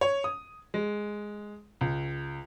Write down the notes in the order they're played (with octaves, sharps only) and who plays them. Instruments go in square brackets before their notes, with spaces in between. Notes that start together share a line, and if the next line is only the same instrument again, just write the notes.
[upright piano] C#5
D#6
G#3
C#2